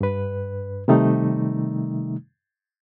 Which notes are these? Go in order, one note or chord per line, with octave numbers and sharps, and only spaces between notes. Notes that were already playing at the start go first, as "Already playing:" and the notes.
G2 B4
C3 D#3 G3 A3 D#4